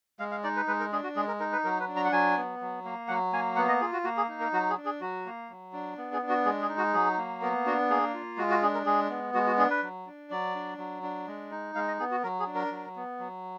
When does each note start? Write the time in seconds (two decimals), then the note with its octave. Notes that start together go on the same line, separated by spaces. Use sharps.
0.19 G#3 F5
0.31 F5
0.43 D#4 D5
0.56 B4
0.68 G#3 B4
0.80 A#4
0.92 D4 G#4
1.04 F#4
1.16 G#3 G#4
1.28 A#4
1.40 D#4 A#4
1.52 B4
1.64 F#3 A#4
1.80 B4
1.88 D4
1.96 A#5
2.05 F#5
2.12 F#3 G#5
2.37 B3
2.61 F#3
2.85 A#3
3.08 F#3 F#5
3.33 A#3 G#5
3.56 B3 F#5
3.68 D#5
3.81 F4 G#4
3.93 F#4
4.04 A#3 F#4
4.17 G#4
4.28 D#4
4.41 A#4
4.53 F#3 F#4
4.70 G#4
4.77 D4
4.85 G#4
5.01 F#3 F#4
5.26 A#3
5.50 F#3
5.73 D4
5.98 B3
6.13 G#4
6.22 D4
6.29 F#4
6.45 G#3 G#4
6.62 G#4
6.69 D#4
6.78 F#4
6.93 F#3 G#4
7.17 A#3
7.42 B3 A#4
7.66 D4 F#4
7.90 A#3 G#4
8.14 F4
8.37 G#3 F#4
8.50 F#4
8.62 D4 G#4
8.74 A#4
8.86 G#3 G#4
9.10 B3
9.34 G#3 F#4
9.47 F#4
9.58 D4 G#4
9.70 B4
9.83 F#3
10.06 D4
10.30 F#3 D5
10.55 D4
10.78 F#3
11.03 D4
11.27 G#3
11.51 D#4
11.75 G#3 F5
11.88 D#5
11.99 B3 G#4
12.11 F#4
12.23 F#3 A#4
12.39 G#4
12.47 D4
12.55 A#4
12.71 F#3
12.96 B3
13.19 F#3